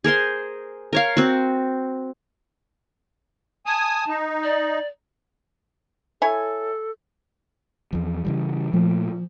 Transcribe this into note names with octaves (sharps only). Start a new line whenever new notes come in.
G#4 A#4 C5 C6
A#4 C#5 F5
C4 F#4
G#5 A5 D#6
D#4
D5
E4 A4 C#5 G#5
E2 F3
C#3 E3 G3
A#2 F3 A3